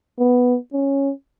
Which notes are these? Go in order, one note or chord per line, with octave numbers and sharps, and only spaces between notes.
B3
C#4